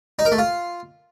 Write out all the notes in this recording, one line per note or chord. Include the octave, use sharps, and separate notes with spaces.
D#4
A#4
A3
F4